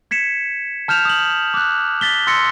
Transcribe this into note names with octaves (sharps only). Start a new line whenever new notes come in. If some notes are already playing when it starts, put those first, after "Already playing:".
G#6 B6 C#7 E7
A5 F6 G6 E7 F7
D#6 F#7
D6 F#6
A6 B6 G7
C6 E6 A6 A#6 C#7